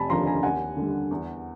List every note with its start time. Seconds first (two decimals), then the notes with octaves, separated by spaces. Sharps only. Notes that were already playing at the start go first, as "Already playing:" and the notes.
Already playing: F1 G#5 A5 B5
0.10 D#2 D3 F3 A#5 C6
0.26 G#5 A#5
0.43 D#2 F#5 G#5
0.77 D3 G3
1.11 E2